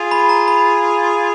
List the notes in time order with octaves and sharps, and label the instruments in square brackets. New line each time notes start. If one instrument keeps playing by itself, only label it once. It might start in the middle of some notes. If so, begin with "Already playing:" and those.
Already playing: [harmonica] F4 G#4
[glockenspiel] B5
A#5
B5